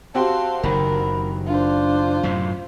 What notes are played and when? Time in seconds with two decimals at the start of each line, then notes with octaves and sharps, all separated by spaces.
0.15 C4 F#4 G4 F5 A5 C6
0.63 F#1 D#3 A#4 B5
1.47 D4 F4 C5
2.23 F#2 A2 C3